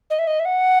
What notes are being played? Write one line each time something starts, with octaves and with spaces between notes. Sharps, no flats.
D#5
E5
D#5
E5
F#5